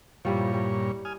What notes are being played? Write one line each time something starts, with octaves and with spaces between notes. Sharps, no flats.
G2 A#2 F3 G3 E4 C#5
G3
G#5 D#6 F6